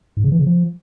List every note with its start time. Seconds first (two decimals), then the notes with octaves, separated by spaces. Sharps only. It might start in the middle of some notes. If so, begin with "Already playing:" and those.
0.17 G#2
0.24 C#3
0.32 E3
0.39 C#3
0.46 F3